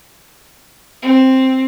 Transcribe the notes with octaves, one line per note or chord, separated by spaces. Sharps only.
C4